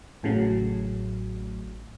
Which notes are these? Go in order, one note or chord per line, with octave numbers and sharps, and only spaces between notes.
A1 A2 C#3 F#3